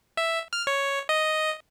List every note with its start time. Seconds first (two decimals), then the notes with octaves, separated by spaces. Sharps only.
0.17 E5
0.53 F6
0.67 C#5
1.09 D#5